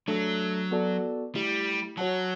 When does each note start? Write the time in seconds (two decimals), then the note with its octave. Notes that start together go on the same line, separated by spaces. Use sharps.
0.08 F#3 A3 D4 A4
0.71 B3 F#4 A4 D5 A5
1.34 G3 A3 E4 G4
1.97 F#3 F#4 C#5 F#5 A5